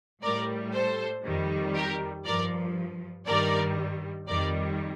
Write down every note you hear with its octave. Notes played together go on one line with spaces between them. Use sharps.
A2 G3 A#4 D5
A4 C5
F2 D#3 G3
G4 A#4
G2 F3 A#4 D5
G2 D#3 G3 A#4 D5
F2 D#3 G3 A#4 D5